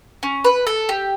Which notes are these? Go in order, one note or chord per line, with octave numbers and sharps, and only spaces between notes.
C#4
B4
A4
G4